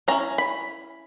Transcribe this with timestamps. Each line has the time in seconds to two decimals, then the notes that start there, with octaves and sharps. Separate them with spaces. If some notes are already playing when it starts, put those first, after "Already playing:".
0.08 F#3 C#4 E4 A#5
0.38 B5